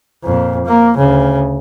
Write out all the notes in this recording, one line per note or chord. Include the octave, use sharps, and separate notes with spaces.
F2 A#2
A#3
D2 C#3